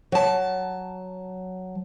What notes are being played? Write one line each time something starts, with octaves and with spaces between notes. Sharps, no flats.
F#3 A5